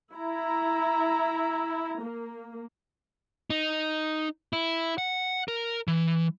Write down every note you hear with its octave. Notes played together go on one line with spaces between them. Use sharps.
E4 A#5
A#3
D#4
E4
F#5
A#4
E3